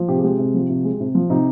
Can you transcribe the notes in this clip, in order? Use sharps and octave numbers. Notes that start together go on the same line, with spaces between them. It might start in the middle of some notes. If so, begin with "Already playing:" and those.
Already playing: F3
C3 G4
G#4
G#3 G4
C3
F3
C3
G#3
C3
F3
C3 D#4